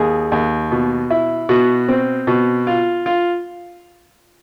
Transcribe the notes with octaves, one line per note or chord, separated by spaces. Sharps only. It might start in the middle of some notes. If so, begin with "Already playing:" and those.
Already playing: D#2 G#4
D#2
B2
E4
B2 F#4
C4
B2
F4
F4